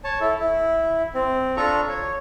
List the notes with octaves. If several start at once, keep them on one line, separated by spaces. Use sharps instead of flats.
C#5 A5
E4 A4
E4
C4
D4 F4 A4 A#5 C#6
C#5